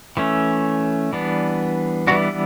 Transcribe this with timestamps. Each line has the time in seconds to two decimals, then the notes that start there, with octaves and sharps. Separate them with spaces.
0.17 E3 A3 C#4
1.13 E3 G3 B3 D4
2.07 E3 G3 B3 D4 F#4